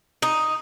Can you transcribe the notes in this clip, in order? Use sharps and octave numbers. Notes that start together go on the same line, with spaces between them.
D#4